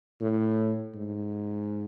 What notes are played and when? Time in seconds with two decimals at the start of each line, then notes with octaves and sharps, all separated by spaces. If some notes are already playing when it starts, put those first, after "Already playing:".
0.21 A2
0.94 G#2